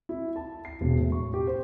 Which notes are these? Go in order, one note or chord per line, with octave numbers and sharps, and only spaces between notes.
E4
A5
C7
E1
A2
C#6
G4
C5